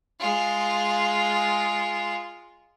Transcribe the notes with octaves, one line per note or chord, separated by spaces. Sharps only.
G#3 F4